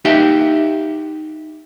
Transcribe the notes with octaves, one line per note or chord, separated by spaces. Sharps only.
D#4 G4 E5 G5